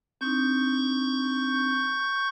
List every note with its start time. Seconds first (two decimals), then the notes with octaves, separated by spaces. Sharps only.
0.21 C4 D4 D#4 C#6 G6